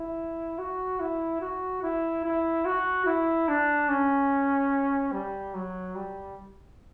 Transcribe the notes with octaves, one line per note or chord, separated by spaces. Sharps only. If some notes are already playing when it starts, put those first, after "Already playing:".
Already playing: E4
F#4
E4
F#4
E4
E4
F#4
E4
D4
C#4
G3
F#3
G3